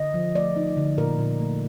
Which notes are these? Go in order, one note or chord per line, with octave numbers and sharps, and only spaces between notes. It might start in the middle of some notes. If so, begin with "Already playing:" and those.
Already playing: D3 D#5
F3
A3 D5
D#4
D3
A#2 A#4
A#2
A3